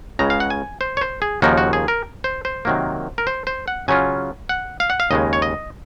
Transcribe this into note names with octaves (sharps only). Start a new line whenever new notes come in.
C#2 C#3 G#3 A#5
F5
F#5
G#5
C5
C#5
C5
G#4
D#2 C#3 F3 A#3 D#4 F#4
F#4
G#4
A#4
C5
C5
C3 D#3 F#3 A#3
A#4
C5
C5
F#5
C#3 F#3 C#4 F4 G#5
F#5
F5
F#5
F5
D#2 C#3 G#3 D#5
C#5
D#5